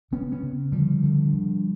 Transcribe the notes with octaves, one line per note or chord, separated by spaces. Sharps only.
C#3 B3 C#4
B3 C#4
C#3
D3 F3 G3
D3
D3